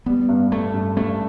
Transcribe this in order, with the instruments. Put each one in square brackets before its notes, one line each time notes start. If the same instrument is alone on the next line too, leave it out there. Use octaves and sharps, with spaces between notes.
[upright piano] G3 [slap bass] B3
[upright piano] G2
[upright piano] G2 [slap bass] A3
[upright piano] G2
[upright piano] G2 [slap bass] A3